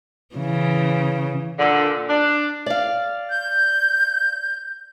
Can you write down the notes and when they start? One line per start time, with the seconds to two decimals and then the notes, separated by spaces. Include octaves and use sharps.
0.36 C#3 E3
1.58 A#2 D3
2.09 D4
2.66 D5 F5
3.30 G6